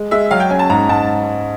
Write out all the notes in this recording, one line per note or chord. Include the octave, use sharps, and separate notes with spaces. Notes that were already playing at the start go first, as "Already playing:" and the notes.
Already playing: G#3
G#3 E5
F#3 F5
G5
C#4 G#5
A5
G#2 A#5
G#2 A5